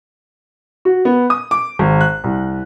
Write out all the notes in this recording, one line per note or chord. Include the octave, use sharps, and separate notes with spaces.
F#4
B3
D#6
D6
G#1
F#6
C2